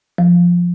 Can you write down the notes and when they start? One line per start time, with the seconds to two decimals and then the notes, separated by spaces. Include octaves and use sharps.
0.18 F3